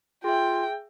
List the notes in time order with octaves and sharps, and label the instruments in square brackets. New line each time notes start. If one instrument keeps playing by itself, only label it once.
[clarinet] F4 [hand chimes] G#4 E5 [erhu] G5